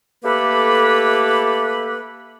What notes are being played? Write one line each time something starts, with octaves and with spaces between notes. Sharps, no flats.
A3 A#3 G4 A4 B4